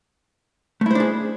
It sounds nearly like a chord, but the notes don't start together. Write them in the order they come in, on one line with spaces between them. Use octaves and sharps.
A3 E4 C5 D4 G#4